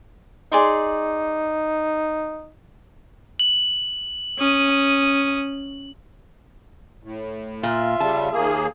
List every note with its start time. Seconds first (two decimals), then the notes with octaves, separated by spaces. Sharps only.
0.52 D#4 G#4 D5 C6
3.39 F#7
4.38 C#4 D#6
7.03 A2
7.63 A#2 F4 E5
8.00 C#3 G3 A5
8.32 D#2 A#3 G#4